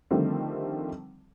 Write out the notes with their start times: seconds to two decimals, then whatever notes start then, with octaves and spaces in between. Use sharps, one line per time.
0.11 D3 D#3 F3 G3 A3 C4